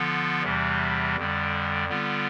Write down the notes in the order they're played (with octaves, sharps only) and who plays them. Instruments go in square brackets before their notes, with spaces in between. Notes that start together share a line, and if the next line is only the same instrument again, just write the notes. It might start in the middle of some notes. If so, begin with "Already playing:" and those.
Already playing: [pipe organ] D3 F3 B3 F4 A4
E2 C3 E3 G3
F2 D3 G3
D3 G3 B3 F4